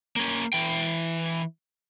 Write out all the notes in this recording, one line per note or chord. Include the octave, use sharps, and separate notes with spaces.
A#3 C#4
E3 G5